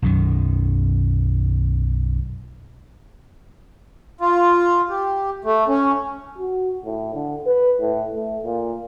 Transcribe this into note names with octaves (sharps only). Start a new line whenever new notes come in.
B1 F#2 D#3
F4
G4
A3
C#4
F#4
A2
D3
B4
A2
A3
A#2